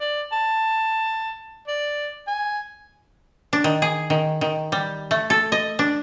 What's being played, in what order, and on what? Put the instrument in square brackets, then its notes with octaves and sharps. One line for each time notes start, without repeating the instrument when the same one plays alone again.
[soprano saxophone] D5
A5
D5
G#5
[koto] D4
D#3
G#4
D#3
D#3
G3
A3
A4
D#5
D4